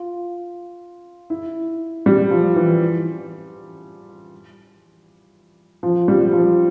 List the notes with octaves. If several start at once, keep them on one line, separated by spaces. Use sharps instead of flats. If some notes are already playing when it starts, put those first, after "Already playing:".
Already playing: F4
E4
G3
F3
E3
F3
G3
F3